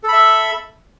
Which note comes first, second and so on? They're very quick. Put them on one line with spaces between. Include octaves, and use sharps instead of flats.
A4 B5 E5